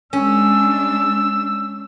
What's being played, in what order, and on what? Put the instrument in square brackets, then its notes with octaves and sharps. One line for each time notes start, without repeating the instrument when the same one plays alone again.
[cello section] G#3 D4 [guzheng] C#4 [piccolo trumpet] E6